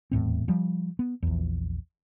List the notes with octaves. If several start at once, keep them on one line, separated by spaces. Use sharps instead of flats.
D#1 E2 A2 C4
F3 G3
B3
A#1 E2